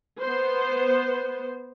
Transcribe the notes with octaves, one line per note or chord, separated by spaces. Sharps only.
B3 C5